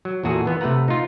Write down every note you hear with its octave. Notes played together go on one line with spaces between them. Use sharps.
F#3
E2 A#2 F#4 G#4 A4
E3 B3 F4
C3 A3 B4 F#5 A#5
D#4 F4